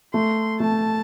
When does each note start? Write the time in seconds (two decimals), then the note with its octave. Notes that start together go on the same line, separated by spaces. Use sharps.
0.14 A3 C6
0.60 A3 A5